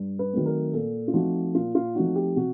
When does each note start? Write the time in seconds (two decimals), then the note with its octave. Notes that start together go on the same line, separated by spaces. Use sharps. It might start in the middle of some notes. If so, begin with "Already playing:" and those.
Already playing: G2
0.19 B4
0.33 D#3 F#3 A3 C4
0.46 A#4
0.73 A#2 A4
1.08 F4
1.14 F3 A3 C4 D#4 F#4
1.55 A#2 F4
1.75 F4
1.95 F3 A3 C4 D#4 F#4
2.15 G4
2.36 C3 F#4